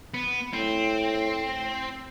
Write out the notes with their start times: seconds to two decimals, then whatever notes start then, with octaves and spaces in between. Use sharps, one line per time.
0.14 B3
0.53 A2 C4